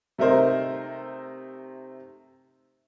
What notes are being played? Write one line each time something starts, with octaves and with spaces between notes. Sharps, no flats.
C3 A3 D#4 A#4 C5